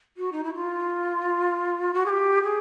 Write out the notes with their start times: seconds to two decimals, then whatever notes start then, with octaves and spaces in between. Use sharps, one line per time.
0.17 F#4
0.32 D#4
0.44 E4
0.54 F4
1.94 F#4
2.05 G#4
2.09 G4
2.43 G#4